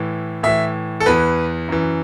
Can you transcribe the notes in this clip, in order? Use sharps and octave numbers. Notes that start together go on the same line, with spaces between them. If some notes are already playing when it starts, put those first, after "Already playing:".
Already playing: A2 E3
A2 E3 E5
A4
E2 E3 B4
F#2 E3